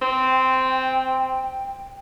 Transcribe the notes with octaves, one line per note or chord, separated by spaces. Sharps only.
C4
G5